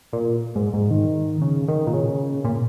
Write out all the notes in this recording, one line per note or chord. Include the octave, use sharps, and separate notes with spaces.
A#2
G#2
G#2
D#3
C#3
D#3
A#2
C#3
A#2